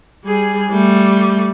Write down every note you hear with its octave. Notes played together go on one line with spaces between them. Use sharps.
G3 G#4
G3 A3